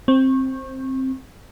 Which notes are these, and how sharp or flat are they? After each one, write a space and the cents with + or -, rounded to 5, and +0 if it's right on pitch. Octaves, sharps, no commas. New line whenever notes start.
C4 +10 C#6 -25